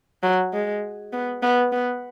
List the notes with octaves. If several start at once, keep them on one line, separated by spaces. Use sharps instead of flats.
F#3
G#3
B3
B3
B3